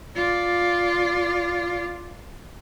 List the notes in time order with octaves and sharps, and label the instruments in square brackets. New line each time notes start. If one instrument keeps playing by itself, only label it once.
[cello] F4 D5